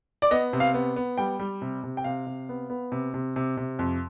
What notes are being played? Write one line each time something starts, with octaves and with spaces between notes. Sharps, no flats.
D5
B3 D#5
C3
F5
B3
B3
G3 G5
G3
C3
C3
G5
C3 F5
C3
B3
B3
C3
C3
C3
C3
F2